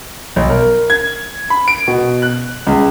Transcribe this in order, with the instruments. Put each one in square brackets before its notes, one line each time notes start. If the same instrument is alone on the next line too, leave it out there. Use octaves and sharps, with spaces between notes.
[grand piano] B1
A#4
G#6
B5
D7
B2
F#6
C#2